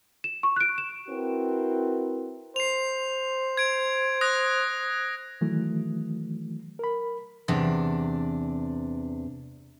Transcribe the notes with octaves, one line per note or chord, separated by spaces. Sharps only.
E7
C#6
F#6 D7
E7
C4 E4 F#4 A#4 B4
C5 C7 F7
G#6 D7
D#6 F#6 A#6
D#3 E3 F#3 A3
A#4 B5
E2 C3 D4